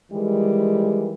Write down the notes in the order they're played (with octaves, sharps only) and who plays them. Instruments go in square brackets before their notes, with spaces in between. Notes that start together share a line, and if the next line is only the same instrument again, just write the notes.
[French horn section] D#3 E3 G3 G#3